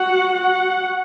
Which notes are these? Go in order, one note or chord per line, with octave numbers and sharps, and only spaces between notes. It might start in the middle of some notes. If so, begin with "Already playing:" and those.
Already playing: F#4 F#5
F#4 F#5